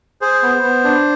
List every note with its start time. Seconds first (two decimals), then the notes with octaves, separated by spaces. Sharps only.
0.21 G#4 C5
0.43 B3
0.63 B3
0.84 D4